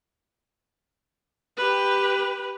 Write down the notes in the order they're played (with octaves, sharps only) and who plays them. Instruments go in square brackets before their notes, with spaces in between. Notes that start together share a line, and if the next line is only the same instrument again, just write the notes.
[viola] G4 B4